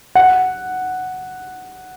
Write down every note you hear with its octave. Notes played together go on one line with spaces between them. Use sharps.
F#5